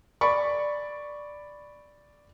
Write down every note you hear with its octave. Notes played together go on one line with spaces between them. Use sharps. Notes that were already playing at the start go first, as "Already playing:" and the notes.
D5 B5 C#6